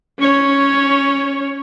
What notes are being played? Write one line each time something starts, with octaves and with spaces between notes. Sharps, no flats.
C#4 C#5